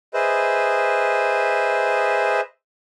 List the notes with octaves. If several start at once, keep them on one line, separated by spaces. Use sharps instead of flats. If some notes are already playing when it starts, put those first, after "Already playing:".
G#4 B4 C5 D#5 E5